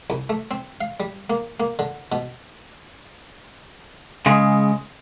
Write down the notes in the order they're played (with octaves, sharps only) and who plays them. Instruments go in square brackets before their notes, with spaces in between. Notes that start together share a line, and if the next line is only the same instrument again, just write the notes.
[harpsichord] C2
A3
C4
F5
G3
A#3
A#3
D3
B2
[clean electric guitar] C#3 G#3